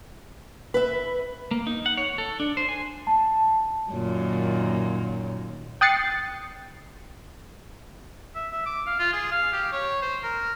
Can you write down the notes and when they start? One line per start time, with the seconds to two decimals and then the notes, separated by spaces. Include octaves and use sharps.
0.74 B4 E5
1.51 A#3
1.67 D#4
1.86 F#5
1.97 C#5
2.18 A4
2.40 D4
2.57 C5
2.69 G#5
3.07 A5
3.92 F#2 A#2 D#3
5.81 G5 D#6 F#6 A6 C7 C#7
8.35 E5
8.52 E5
8.66 D6
8.86 F5
8.99 F4
9.13 G#4
9.32 F5
9.53 G4
9.72 C#5
10.02 C5
10.23 A#4